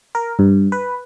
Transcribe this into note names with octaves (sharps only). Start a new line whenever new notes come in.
A#4
G2
B4